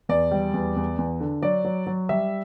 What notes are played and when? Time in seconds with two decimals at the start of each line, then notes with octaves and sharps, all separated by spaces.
0.09 E2 D5
0.31 G3
0.54 E2
0.76 E2
0.98 E2
1.21 D3
1.42 F#3 D5
1.65 F#3
1.87 F#3
2.09 G3 E5